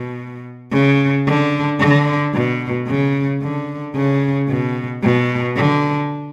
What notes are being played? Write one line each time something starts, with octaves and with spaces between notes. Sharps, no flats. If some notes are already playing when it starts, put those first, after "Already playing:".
Already playing: B2
C#3
D3
D3
B2
C#3
D3
C#3
B2
B2
D3